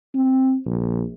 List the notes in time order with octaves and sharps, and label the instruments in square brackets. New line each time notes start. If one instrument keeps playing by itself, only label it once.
[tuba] C4
A#1